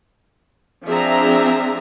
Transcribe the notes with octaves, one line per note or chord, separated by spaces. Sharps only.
F3 C4 D4 G#4 E5 A#5